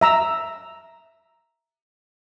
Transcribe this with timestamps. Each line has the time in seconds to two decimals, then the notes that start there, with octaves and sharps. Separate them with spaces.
0.01 E5 A#5 E6